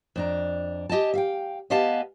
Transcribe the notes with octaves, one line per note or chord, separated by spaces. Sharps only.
F2 D4 A#5
G4 D#5 G#5 A5
E5 F5 G5
B3 G4 D#5 F5 G#5 A5